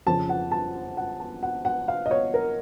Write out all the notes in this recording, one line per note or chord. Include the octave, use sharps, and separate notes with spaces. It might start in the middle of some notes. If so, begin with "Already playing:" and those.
F2 C#3 F3 A5
F#5
A5
F#5
A5
F#5
F#5
F5
D#5
C#5
A#4